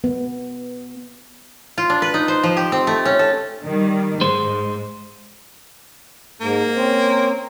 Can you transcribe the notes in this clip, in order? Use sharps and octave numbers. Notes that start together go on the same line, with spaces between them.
B3
F4
D4
B4
D#4
C5
F3
G4
C4
A3
C#4
A4
D#3 G3
G#2 G#3 C5
G#2 A#3
C4 C#4 C5